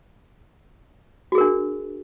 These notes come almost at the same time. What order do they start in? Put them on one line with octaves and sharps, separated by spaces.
F#4 G#4 A#4 D4